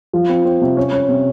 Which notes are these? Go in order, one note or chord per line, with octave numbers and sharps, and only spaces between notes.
F3
C4
C4
C3
C#4
C#4
C3